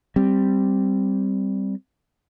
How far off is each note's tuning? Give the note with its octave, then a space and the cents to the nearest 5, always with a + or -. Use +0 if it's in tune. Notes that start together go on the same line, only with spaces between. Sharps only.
G3 +0 C4 +0